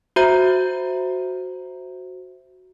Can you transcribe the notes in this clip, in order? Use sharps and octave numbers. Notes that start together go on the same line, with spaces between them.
F#4 C5 E5 A#5 G6